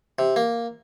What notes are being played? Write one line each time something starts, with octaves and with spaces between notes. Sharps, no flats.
C3
A#3